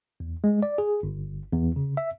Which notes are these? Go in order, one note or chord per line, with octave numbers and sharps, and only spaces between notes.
E2
G#3
D5
G#4
G1
E2
C#3
E5